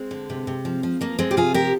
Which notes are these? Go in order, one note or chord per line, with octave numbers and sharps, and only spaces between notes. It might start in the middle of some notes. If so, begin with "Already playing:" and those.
Already playing: G#3 C4
D3
C3
C3
F3
F3
F3 A#3
F3 G#3 C4
G4
C3 F4 G#4
F3 G4 A#4